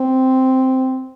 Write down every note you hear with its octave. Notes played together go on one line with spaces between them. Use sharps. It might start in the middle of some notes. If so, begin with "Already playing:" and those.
Already playing: C4